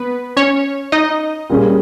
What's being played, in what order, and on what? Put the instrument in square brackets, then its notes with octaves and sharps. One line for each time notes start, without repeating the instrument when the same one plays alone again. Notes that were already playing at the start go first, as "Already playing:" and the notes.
Already playing: [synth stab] B3 B4
C#4 C#5
D#4 D#5
[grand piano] A#2 G3 C#4 G#4